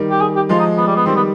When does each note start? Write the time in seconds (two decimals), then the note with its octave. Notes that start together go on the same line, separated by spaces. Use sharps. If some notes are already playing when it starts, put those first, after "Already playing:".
Already playing: D#3 G3
0.11 G4
0.21 G#4
0.36 G4
0.49 F3 G#3 F4
0.59 D#4
0.78 B3
0.87 G3
0.96 B3
1.06 D#3 G3 C4
1.16 B3